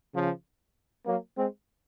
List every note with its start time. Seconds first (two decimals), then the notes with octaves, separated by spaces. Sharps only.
0.15 C#3 F3
1.06 F#3 A#3
1.37 G#3 C4